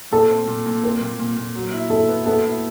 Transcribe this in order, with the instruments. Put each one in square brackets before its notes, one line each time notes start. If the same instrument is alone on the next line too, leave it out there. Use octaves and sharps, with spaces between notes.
[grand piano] A#2 [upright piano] A4
[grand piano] C4
A#2
A#2
[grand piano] C4 [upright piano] A#4
[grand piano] A#2
A#2
A#2
F#3
E4
[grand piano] E4 [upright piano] A4
[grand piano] B3
[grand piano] B3 [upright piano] A4
[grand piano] E4